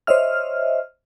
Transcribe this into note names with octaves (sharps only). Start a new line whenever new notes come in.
C5 C#5 D#5 E5 F6